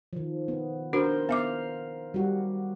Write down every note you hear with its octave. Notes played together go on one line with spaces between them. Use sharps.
D#3 F3
B3
D4 F#4 A#4 C5
B3 E5 F5 D6
G3 F#4